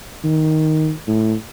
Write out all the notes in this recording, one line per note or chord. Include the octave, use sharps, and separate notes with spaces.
D#3
A2